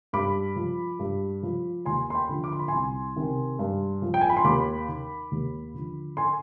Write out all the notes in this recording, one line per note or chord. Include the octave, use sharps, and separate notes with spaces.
G2 B5 D6
F3
G2
F3
D#2 G#5 C6
C6
G5 B5
D3 F3
D6
C6
B5
C2 G#5 C6
C3 D#3
G2
F3
G5
G#5
B5
C6
D#2 B5 D6
D#3
D#2
D3 F3
G#5 C6